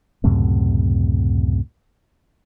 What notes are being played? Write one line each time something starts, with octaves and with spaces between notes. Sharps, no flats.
C#2 F#2 A2 C3